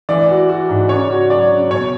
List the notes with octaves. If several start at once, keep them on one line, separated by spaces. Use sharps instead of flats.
E3 D5
F#4
F#4
G#2
C#3 C#5
F#4
F#3 D5
C#3
B2 C#5